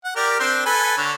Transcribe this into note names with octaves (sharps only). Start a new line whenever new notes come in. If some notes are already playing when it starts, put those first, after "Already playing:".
F#5
G4 A#4 D5
C4 D4 C5
A4 B4 G#5
D3 C#5